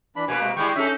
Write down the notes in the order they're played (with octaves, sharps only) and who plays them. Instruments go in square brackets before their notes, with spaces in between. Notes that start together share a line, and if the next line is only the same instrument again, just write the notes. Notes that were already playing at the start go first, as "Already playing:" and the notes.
[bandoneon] E3 D4 B5
[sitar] B2 A#3 B4 [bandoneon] G#5
[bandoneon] C3 G#3
[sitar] G3 G#3 E4 [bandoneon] G5 C#6
[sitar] C#4 D#4 A4 [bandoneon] E5